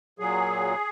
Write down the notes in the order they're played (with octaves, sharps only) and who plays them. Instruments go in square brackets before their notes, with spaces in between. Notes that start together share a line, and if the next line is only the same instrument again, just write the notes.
[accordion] A#2 F#3 G#4